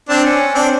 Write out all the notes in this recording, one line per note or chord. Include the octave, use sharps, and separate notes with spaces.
C4 D4
C#4
C4 D4